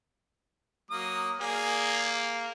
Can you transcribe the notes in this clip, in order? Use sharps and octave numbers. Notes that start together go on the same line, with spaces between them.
F#3 A#3 D#6
A#3 G#4 D5